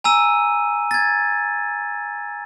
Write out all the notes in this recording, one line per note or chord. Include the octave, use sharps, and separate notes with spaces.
G#5 A#5 E6 D#7
G#6 A6